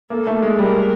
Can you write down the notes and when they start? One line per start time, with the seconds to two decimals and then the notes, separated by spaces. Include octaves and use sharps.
0.10 A#3 A4
0.27 A3
0.42 G#3
0.58 G3 A#4